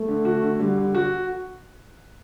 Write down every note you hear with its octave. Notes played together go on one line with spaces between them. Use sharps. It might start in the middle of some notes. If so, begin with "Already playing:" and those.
Already playing: A3
D3
F#4
D3
D3 G3
D3
F#4